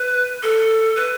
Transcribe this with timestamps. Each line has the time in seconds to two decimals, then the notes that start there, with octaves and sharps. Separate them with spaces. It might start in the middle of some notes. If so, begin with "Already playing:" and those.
Already playing: B4
0.43 A4
0.96 B4